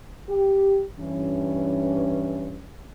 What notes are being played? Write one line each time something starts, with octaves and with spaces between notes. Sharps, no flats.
G4
G2 E3 C#4